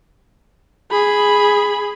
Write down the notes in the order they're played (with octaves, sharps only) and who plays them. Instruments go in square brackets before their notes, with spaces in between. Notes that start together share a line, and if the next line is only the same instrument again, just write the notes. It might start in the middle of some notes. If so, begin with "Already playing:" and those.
[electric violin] G#4 B5